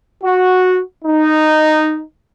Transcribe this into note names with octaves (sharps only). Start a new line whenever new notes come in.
F#4
D#4